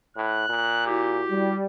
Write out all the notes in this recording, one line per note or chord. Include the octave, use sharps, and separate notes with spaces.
A2 F#6
A#2
E4 F#4 G4
G3